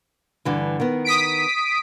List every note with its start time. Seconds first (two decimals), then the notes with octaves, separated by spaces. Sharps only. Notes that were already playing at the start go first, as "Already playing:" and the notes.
0.45 G2 D3 E3
0.80 D#3 B3
1.04 D#6 B6 D7